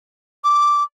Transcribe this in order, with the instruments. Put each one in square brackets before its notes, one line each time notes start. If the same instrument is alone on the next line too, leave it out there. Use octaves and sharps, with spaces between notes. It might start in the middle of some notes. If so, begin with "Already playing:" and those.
[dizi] D6